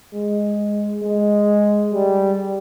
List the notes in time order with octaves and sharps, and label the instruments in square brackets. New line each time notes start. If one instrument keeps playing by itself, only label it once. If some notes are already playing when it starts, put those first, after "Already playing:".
[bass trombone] G#3
G#3
G3